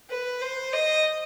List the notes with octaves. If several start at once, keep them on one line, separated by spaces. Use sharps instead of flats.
B4
C5
D#5